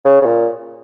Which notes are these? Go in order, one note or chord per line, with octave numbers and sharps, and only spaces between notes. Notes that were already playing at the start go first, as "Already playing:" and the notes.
C#3
C#3
A#2